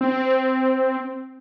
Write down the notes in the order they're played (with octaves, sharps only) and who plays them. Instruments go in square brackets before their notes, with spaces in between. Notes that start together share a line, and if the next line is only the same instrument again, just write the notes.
[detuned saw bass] C4